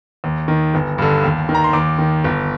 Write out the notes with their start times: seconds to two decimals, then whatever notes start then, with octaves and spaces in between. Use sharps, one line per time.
0.24 D#2
0.48 D#3
0.74 G1
0.98 G2 D3
1.24 D#2
1.49 D#3
1.55 A#5
1.64 C6
1.73 D#2 D6
1.98 D#3
2.24 G1